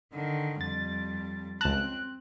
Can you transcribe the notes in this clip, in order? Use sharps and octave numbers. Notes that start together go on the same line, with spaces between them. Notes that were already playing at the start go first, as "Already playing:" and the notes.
D3 D#3
F2 G3 A6
C#2 C4 A5 F#6